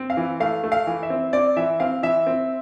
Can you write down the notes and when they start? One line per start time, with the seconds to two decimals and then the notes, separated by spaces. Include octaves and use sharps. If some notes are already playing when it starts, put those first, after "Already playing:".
Already playing: C4
0.10 F5
0.17 E3
0.40 A3 F5
0.64 A3
0.72 F5
0.87 E3
1.03 E5
1.10 C4
1.33 C4 D5
1.57 E3 E5
1.80 C4 F5
2.03 E3 E5
2.27 C4